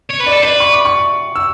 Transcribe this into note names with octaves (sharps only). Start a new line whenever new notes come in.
C#5
B4
D5
A4
B4 D5
C#6
D6
C#6
E6